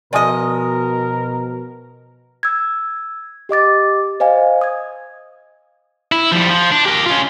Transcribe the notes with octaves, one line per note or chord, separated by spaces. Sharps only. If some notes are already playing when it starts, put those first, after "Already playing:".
B2 F3 A#4 D5 D#5 G#5 D#6
E6 G#6
G4 D#5 D6 A6
C5 D#5 F5 G#5
D#6 G#6
E4
F3 G3
F3
D4
G4 A#4
C#4 F4